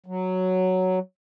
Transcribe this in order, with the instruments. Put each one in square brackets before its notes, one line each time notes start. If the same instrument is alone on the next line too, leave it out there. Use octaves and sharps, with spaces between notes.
[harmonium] F#3